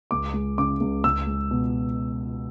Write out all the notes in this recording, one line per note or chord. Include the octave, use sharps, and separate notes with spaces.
C#2 D6
G#3
C#3 D6
C#2
C#2 E6
G#3
B2